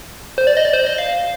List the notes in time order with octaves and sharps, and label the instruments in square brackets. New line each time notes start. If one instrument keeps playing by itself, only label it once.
[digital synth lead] C5
D5
D#5
D5
C5
D#5
F5